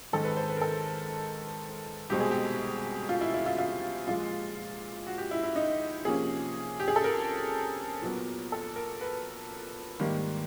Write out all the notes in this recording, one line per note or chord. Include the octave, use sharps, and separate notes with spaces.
G#2 D#3 G#3 C4 A4
B4
C5
B4
A#4
A4
C2 B2 G#3 C4 G4
G#4
G4
F4
E4
E4
F4
F4
A#2 F3 G#3 F4
F#4
G4
E4
E4
D#4
C3 F3 A#3 C#4 G#4
G4
G#4
A4
A#4
A#2 F#3 B3
A4
A#4
B4
G#2 D#3 G3 A#3